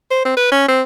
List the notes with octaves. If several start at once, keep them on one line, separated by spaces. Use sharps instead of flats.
C5
C4
B4
C#4
C4